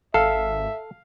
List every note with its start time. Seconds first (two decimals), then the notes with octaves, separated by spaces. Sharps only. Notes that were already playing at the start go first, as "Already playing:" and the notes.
0.14 G#1 A4 E5 F5